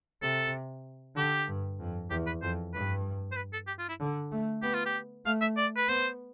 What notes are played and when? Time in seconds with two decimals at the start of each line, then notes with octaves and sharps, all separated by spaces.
0.22 C3 A4
1.16 D3 G4
1.48 G2
1.80 F2
2.10 E2 G4
2.26 B4
2.42 F2 C5
2.74 G2 B4
3.32 C5
3.36 B4
3.53 A4
3.68 G4
3.79 F4
3.89 E4
4.00 D3
4.31 A3
4.62 B3 G4
4.74 F4
4.86 G4
5.26 A3 F5
5.41 E5
5.57 D5
5.76 B4
5.88 B3 C5